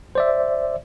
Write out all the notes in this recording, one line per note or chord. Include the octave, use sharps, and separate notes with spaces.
C5 D5 E5